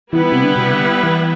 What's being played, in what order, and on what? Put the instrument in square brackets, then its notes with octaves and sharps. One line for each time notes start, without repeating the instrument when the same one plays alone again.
[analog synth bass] E3 [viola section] G3 B3 E4 B4
[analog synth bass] C3
D3
B2
C3
D3
E3